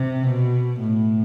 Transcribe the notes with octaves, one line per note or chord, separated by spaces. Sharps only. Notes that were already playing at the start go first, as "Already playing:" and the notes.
Already playing: C3
B2
A2